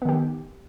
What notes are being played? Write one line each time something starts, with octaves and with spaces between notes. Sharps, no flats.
D#3 B3 G4